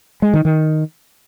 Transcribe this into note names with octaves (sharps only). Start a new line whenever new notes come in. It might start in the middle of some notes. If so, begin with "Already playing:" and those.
G#3
D#3
D#3